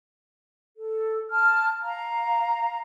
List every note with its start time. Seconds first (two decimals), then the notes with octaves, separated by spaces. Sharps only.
0.77 A4
1.30 A5 F6
1.82 F5 A#5